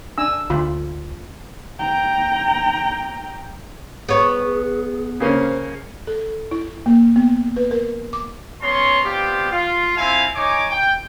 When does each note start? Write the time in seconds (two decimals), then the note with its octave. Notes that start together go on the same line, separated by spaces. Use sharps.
0.18 D4 G#5 E6
0.50 D2 F4 B5
1.79 G5 A#5
4.09 B3 G#4 C#5
5.20 C#3 A#3 C#4 C5
6.07 A4
6.51 E4
6.86 A#3
7.16 B3
7.57 B4
7.71 A#4
8.13 D6
8.61 B3 C#4 C#5 A#5 C6
9.04 B3 C4 D4 F4 G4
9.51 F4
9.97 C4 E4 F4 E5 F5 G#5
10.35 D#4 C#5 G#5 D6
10.69 G5